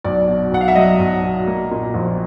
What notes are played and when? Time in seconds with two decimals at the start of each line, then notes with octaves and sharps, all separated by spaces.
0.04 B1 D5
0.28 B2
0.52 B1 F#5
0.61 F5
0.68 E5
0.75 F#3 D#5
0.99 B1
1.24 B2
1.47 A#3
1.71 A#2
1.94 A#1